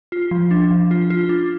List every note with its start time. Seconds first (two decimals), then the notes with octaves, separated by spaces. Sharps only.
0.12 F4
0.31 F3
0.51 D4
0.71 F3
0.91 F4
1.10 F4
1.29 D4